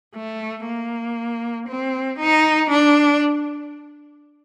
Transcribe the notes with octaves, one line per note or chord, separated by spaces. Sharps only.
A3
A#3
C4
D#4
D4